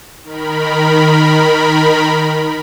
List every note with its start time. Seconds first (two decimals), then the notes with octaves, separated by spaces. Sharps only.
0.23 D#3 A#4 B5